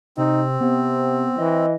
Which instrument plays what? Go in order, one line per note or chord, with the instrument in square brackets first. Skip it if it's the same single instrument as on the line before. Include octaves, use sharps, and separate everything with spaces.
[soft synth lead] C3 [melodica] C4 [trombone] D#4
[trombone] C3 [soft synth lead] B3
[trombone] E3 [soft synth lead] D#5